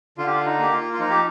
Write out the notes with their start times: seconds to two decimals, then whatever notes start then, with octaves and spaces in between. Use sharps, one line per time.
0.18 D3 F4
0.27 G4
0.35 F4
0.46 D#4
0.59 A#3 G4
0.73 F4
0.93 F4
1.00 F3 D#4
1.10 G4